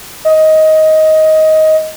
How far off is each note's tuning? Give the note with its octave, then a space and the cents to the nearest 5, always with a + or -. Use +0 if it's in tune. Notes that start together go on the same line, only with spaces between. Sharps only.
D#5 +15